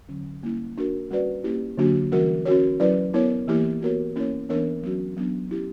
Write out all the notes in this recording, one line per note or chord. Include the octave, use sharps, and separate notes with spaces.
D3 F#3 C#4
G3 A#3 C#4 E4
A#3 D4 F#4 A#4
G3 C#4 F#4 B4 D5
A#3 C#4 E4 G4
D3 F#3 A#3 D4 F#4
E3 G3 C#4 F#4 A#4
C#4 F#4 A#4 C#5
F#3 C#4 E4 B4 D5
B3 E4 A#4 C#5
E3 A#3 E4 G4 A#4
B3 F#4 A#4 C#5
A#3 C#4 E4 A#4 C#5
E3 B3 D4 A#4 C#5
F#3 C#4 F#4
F#3 B3 D4
C#4 E4 G4